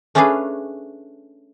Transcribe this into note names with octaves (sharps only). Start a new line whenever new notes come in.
A3 C#4 D4 G#4 B4 F5